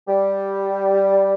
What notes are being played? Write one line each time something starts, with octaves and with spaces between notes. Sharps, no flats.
G3